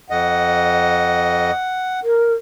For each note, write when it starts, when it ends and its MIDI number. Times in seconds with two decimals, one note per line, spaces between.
0.10 1.51 41
0.10 1.51 75
0.10 2.00 78
2.03 2.34 70